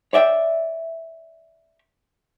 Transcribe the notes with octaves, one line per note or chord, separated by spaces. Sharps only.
C#5 D5 E5 F#5 G5